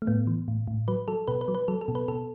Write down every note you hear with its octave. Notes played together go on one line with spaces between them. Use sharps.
A3
A2 B3
E3
A2
A2
F#3 B4
F#3 A4
B2 B4
B4
F#3
B4
F#3 A4
A4
B2
B4
B2 A4